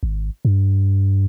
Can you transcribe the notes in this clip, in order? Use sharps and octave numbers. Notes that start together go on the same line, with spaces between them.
G#1
G2